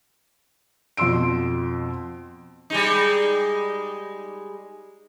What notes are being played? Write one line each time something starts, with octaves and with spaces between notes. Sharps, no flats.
F2 B2 C6 E6 D7
G3 G#3 D#4